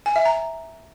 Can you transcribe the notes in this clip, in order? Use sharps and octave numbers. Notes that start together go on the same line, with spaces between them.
G#5
E5
A#5